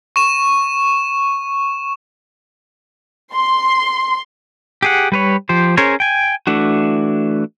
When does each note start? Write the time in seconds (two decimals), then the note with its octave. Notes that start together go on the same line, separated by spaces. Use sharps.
0.16 C#6 E7
3.33 C6
4.82 G4 G#4 F#5
5.12 G3 B4 C#5
5.49 F3 G4 C5
5.77 C#4 G#4 A#4 C5 C#5
6.00 G5 G#5
6.47 E3 A3 D4 F#4